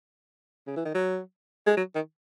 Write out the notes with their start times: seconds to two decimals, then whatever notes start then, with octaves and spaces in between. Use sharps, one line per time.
0.67 C#3
0.76 E3
0.85 D#3
0.94 F#3
1.66 G#3
1.77 F#3
1.95 D#3